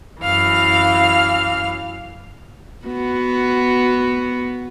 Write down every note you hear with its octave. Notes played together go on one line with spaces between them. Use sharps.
F#2 E3 F5 F6
B3 F#4